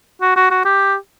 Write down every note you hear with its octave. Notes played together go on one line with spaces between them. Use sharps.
F#4
F#4
F#4
G4